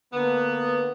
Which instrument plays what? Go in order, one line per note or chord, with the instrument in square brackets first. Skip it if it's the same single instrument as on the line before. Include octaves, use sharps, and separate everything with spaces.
[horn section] D3 A#3 B3